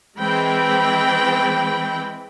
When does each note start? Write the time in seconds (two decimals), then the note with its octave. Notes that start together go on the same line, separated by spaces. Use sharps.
0.19 E3 G#3 C4 E4 G5 B5